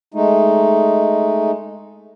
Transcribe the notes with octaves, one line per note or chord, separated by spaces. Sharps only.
G#3 A3 D#4